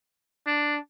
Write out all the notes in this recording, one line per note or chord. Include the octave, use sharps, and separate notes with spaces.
D4